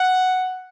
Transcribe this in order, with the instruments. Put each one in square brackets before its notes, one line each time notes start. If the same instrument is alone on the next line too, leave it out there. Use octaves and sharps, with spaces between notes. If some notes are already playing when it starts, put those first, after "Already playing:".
Already playing: [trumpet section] F#5